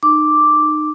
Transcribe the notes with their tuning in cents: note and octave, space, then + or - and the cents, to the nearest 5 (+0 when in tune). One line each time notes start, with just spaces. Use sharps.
D#4 -30 D6 +0